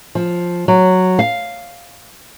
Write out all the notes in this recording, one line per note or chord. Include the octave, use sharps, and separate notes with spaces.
F3
F#3
F5